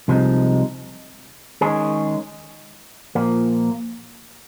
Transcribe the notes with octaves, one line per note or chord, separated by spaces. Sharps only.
C2 C3 F3 G#3 D#4
D#3 G#3 C#4 G#4
A#2 F3 A#3